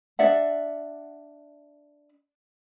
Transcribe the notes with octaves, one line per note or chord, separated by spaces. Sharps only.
D4 D5 E5 F#5